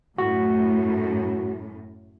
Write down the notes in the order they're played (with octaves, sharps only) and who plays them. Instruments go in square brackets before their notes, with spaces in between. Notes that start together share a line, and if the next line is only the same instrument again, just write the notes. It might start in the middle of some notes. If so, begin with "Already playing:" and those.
[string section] F#2 A2 [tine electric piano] F#4